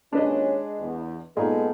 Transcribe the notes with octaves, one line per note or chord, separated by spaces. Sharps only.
D#2 A#2 G#3 C#4 D4 B4 D#5
E2
A#2 G#3 B3 D#4 A4